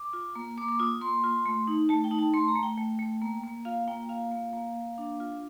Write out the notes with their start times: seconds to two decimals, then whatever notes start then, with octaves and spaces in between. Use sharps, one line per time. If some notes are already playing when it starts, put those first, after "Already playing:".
Already playing: D6
0.13 F4
0.35 A#3
0.58 A#3 D6
0.68 D6
0.79 F4 D#6
1.01 A#3 C6
1.24 F4
1.46 A3
1.67 D#4
1.89 A3 A5
2.04 G5
2.11 D#4
2.19 A5
2.34 A3 C6
2.48 A#5
2.55 A3
2.63 G5
2.78 A3
2.99 A3
3.22 A#3
3.43 A#3
3.65 F4 F5
3.88 A#3 G5
4.09 F4 F5
4.31 A#3
4.53 A#3
4.75 A#3
4.98 D4
5.20 F4